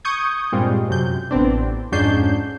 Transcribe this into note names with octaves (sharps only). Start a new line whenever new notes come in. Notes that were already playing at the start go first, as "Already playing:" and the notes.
C#6 D#6 G6 G#6
G2 A#2 G3 G#3 C4 F4
F#2 C3 G6
A1 B3 C4 D4
F2 G#2 C#4 D4 G6 C7